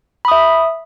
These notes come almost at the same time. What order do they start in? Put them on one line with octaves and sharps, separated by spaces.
B5 D#6 E5